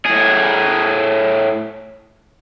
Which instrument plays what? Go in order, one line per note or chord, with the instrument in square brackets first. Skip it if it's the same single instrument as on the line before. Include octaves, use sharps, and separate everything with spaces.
[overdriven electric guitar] A2 G#4